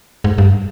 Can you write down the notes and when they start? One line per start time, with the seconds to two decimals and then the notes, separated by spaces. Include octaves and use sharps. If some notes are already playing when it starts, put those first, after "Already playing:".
0.24 G#2
0.38 G2